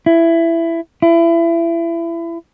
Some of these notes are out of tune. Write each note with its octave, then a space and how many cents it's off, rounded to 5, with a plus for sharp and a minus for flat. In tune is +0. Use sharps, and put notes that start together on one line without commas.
E4 +15
E4 +30